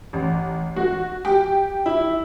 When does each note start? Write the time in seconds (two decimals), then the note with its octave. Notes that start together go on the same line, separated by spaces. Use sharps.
0.13 A1
0.76 F#4
1.25 G4
1.86 E4